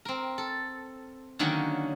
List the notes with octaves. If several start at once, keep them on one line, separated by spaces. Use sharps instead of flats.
C4 A#4
A4
D3 D#3 F#3 A#3 C#4